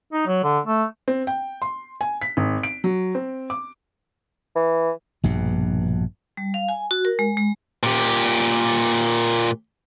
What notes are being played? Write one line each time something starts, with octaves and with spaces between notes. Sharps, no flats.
D#4
F#3
D3
A3
C4
G5
C6
G#5
B6
G#1
D7
F#3
C4
D6
E3
A#1 G2 B2
G3
F5
G#5
F#4
A#4
G#3
G#3
A#2 G4